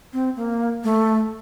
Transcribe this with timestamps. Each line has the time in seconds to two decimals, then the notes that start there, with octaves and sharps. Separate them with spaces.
0.13 C4
0.36 A#3
0.84 A3